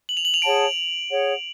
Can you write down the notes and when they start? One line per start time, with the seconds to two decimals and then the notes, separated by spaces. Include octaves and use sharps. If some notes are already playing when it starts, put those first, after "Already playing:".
0.09 F#7
0.17 F7
0.25 F#7
0.34 F7
0.42 G#4 C#5 F#5 A5 D7
1.10 G#4 C#5 F#5